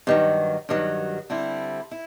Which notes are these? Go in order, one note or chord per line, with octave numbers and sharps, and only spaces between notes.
G2 D#3 F#3
G2 D#3 F#3
D3 G3 C4 E4
E4